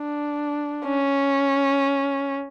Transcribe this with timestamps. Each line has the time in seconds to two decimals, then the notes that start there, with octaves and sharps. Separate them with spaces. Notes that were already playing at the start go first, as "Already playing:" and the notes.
Already playing: D4
0.86 C#4